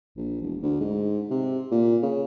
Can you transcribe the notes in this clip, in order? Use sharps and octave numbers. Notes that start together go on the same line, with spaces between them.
A#1
E1
D2
G#2
C3
A#2
C#3